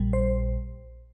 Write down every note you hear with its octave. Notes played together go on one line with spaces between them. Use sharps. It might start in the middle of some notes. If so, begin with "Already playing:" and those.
Already playing: A#1 A#2 G3
C5